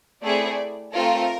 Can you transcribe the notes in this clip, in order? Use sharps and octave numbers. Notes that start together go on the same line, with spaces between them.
A3 C4 E4 G#4 D5
A3 C4 F4 A4 A#4